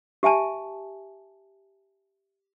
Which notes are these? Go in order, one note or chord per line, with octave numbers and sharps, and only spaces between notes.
G4 E5 G#5 A5